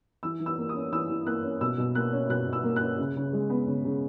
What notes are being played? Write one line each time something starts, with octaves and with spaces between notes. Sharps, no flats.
E3 E6
E3
E6
A#3
D#6
C#4
E3 E6
E3
A#3 F#6
C#4
B2 E6
B2
A#3 F#6
C#4
B2 F#6
B2
E6
A#3
F#6
C#4
C#3
C#3
G#3
B3
C#3
C#3